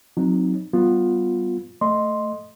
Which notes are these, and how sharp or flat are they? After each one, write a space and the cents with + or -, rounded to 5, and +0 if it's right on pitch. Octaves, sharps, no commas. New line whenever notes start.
F#3 -15 C4 +0 D#4 +0
G3 -30 B3 +0 F4 +10
A3 +0 D#5 -10 C6 +0